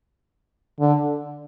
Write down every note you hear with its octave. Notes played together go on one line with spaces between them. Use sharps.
D3